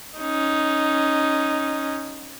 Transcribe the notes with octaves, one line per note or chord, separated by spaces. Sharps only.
C#4 D#4